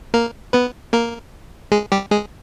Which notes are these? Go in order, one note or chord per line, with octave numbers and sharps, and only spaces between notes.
A#3 A#4
B3 B4
A#3 A#4
G#3 G#4
G3 G4
G#3 G#4